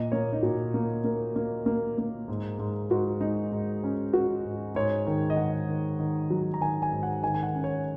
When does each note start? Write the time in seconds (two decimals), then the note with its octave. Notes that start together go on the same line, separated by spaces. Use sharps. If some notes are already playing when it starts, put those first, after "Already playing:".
Already playing: A#2 D#5
0.12 A#3 C#5
0.33 D#4
0.43 A#2 F#4
0.74 A#3
1.04 A#3 A#4
1.36 A#3
1.66 A#3
1.98 A#3
2.28 G#2
2.59 G#2
2.90 G#2 F#4
3.21 G#3 D#4
3.52 G#2
3.84 C#4
4.13 C#4 F#4
4.45 G#2
4.75 G#2 C#5
5.07 D#3
5.30 D#5
5.37 G#2 F#5
5.69 D#3
5.99 D#3
6.30 F#3
6.54 A#5
6.61 D#3 G#5
6.82 G#5
6.92 G#2
7.03 F#5
7.23 D#3 G#5
7.34 G#5
7.43 F#5
7.54 C#4
7.64 C#5